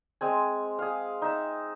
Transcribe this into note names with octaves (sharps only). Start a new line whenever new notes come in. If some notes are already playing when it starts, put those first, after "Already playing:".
G#3 C4 G#5
G#4 F5
D#4 E5